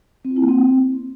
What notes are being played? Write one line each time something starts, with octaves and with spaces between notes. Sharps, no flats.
C4
F4
E4
A#3
C4